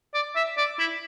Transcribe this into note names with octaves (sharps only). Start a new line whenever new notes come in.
D5
E5
D5
E4